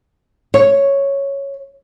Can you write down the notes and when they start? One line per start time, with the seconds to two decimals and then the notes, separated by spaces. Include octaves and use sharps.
0.54 C#5